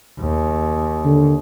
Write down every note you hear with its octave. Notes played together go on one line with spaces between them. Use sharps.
D#2
D3